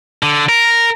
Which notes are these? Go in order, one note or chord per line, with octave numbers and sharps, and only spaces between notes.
D3
A#4